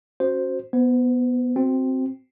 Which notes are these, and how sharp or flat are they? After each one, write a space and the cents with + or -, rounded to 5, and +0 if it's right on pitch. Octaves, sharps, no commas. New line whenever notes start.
C#4 -20 F#4 +0 C5 +0
B3 +0 C5 -40
C4 +0 F#4 +0